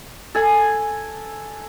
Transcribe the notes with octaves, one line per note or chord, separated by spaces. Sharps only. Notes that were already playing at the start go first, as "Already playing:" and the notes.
A4 G#5